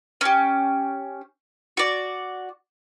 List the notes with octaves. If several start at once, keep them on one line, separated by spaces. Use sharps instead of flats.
C#4 G4
F#4 D5